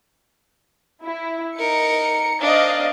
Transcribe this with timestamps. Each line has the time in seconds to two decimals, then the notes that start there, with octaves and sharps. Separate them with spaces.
1.02 E4
1.58 D#4 A#4 C#7
2.41 D4 C5 D5 D#5 F5